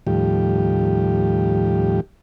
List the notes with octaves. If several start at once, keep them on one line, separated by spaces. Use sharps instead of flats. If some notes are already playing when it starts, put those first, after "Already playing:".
D#2 A2 F3 G3 G4